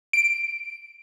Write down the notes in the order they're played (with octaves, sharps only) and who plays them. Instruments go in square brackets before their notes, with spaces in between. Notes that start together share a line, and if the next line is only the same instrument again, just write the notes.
[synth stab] D7